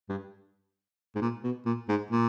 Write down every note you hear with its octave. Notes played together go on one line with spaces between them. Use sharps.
G2
G#2
A#2
B2
A#2
G#2
A#2